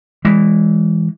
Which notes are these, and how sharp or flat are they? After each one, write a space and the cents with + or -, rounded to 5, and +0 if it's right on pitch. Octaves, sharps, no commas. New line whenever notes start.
E3 +0 G#3 -15